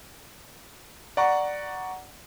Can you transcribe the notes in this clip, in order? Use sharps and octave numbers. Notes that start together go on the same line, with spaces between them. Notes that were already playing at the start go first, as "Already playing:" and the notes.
D5 F#5 A#5 C#6